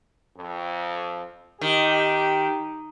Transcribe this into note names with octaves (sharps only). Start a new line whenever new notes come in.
F2
D#3 G4